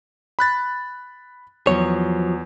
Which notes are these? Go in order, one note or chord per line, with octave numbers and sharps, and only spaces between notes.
B5 F#6 A6
E2 F3 F#3 C#5